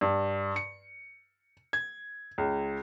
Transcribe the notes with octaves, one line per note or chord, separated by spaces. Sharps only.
G2
C#7
G#6
C#2